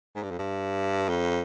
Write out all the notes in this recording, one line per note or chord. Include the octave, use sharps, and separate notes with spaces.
G#2
G2
F2
G2
F2